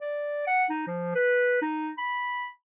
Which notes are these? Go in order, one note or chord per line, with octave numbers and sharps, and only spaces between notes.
D5
F#5
D#4
F3
B4
D#4
B5